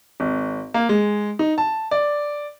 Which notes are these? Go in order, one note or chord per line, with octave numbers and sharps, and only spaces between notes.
G#1
A#3
G#3
D#4
A5
D5